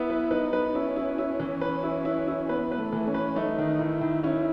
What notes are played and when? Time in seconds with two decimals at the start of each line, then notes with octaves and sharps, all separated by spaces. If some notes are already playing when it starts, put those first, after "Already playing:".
Already playing: B3 E4
0.10 B4
0.31 D#4 B4
0.53 B4
0.75 C#4 E4
0.96 E4
1.18 E4
1.40 E3
1.61 B4
1.83 E4
2.05 E4
2.27 E4
2.49 B3 B4
2.72 B4
2.78 A3
2.93 E3
3.07 C#4
3.14 B4
3.36 A3 D#4
3.58 D#3
3.79 D#3 E4
4.01 D#3
4.23 C#4 E4